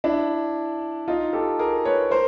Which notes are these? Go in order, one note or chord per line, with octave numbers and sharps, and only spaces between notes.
D4 E4
D#4 F4
G4 A4
G#4 A#4
B4 C#5
A#4 C5